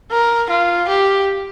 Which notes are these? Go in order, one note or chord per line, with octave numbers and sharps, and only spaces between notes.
A#4
F4
G4